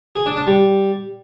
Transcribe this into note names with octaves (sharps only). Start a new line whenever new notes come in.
G#4
D4
D4
G3